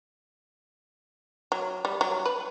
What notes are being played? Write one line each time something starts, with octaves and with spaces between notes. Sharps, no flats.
F#3
G3
F#3
B4